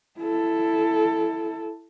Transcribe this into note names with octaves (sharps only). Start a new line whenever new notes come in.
E4 A4